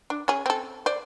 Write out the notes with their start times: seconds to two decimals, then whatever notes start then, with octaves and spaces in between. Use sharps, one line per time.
0.10 D4
0.28 C#4 G#4
0.46 C4 A4
0.86 C5 D5